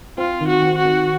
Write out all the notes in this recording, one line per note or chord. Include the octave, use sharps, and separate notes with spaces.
C4 F4
D#3
F#4
C4
F#4
D#3